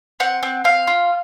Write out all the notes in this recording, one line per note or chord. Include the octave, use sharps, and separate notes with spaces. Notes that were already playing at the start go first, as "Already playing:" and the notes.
C4 F#5
C4
C4 F5
F4